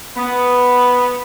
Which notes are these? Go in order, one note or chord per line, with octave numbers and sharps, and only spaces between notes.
B3